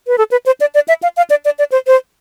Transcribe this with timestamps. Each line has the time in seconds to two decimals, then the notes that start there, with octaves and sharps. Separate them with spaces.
0.07 B4
0.18 A4
0.31 B4
0.46 C5
0.60 D5
0.75 D5
0.88 E5
1.03 F5
1.17 F5
1.30 D5
1.45 D5
1.59 D5
1.72 C5
1.87 C5